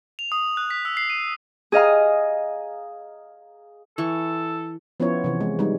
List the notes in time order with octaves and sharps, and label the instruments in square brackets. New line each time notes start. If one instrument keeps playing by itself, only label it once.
[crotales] F7
D#6
F#6
B6
E6
C7
D#7
[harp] G#4 D#5 F5 A#5
[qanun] E3 C#6 [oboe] A4
[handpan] F3 B3 C#4 E4 F4 C#5
C3 E3
G#3
G3 G#3 D#4